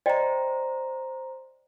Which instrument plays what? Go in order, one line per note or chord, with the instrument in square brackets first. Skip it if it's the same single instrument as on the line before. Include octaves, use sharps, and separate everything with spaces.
[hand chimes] C5 A#5 [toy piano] D5 D#5 G5